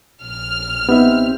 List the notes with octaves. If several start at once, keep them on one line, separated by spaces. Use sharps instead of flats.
A#1 F6
B3 C4 D#4 G4 E5